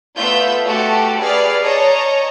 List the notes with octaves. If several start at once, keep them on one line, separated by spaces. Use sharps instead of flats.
A3 B3 F4 E5 G6
A3 F#4 G4 A4
G#4 B4 D5 F6 C7
C#5 D#5 A5 A#5